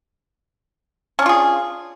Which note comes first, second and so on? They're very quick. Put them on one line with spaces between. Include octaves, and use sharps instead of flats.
C#4 D4 F4 G#4